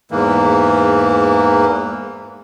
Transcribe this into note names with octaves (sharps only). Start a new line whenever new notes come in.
E2 G#2 E3 A#3